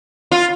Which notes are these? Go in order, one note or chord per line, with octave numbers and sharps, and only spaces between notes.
F4